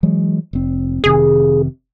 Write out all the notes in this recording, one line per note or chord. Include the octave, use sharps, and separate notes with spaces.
E3 F#3 G#3
F1 C4
F1 C3 D#3 G#4